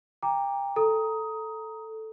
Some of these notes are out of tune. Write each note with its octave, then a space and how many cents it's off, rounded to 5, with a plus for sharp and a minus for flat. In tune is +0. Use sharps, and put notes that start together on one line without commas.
G5 +30 A#5 +0 D6 +0
A4 +0 A#5 +0 D#6 +15